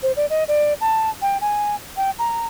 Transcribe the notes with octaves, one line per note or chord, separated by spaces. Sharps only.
C5
D5
D#5
D5
A5
G5
G#5
G5
A#5